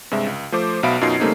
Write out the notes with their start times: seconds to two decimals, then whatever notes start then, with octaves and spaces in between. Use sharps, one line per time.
0.11 G2 C3 G#3 E5
0.26 C#2
0.52 F3 A3 C5 D6
0.83 B1 B2 E5 F5 B5 D7
1.01 F#2 B2 D#4 F4 G#6 C7
1.20 C#3 G3 A3 A#3 C4 D#4